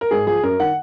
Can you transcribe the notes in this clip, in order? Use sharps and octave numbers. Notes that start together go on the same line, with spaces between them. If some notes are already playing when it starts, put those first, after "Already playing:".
A#4
G#2 G#4
F3 G#4
F#2 A#4
D#3 F#5